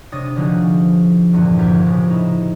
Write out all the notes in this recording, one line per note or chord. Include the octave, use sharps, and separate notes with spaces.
C3 D4 C#5 D#6 A6 A#6
D3 F3 D#4 F#4 G#4
E2 G2 A#2 D3 B3
F1 A#1 F3 G4 G#6 B6
A2 C#3
D#4 E4